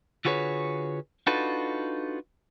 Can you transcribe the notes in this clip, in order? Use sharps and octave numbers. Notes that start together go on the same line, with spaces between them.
D3 F4 F#4 G#4 B4 C#5
D4 D#4 F4 F#4 A4 B4